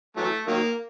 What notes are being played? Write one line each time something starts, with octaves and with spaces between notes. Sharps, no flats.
E3 F#3 A3
D#3 F#3 A#3